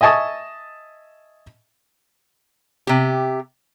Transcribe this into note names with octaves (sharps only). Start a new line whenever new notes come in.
D#5 E5 G#5 A5 C#6 D#6
C3 G4